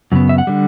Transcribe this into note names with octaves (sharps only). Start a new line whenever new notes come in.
F#2 C#3 B3
E5
F#5
D3 G3